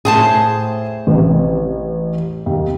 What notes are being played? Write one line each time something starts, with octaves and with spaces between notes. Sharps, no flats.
A2 G#4 C5 A5
A1 C3
D#2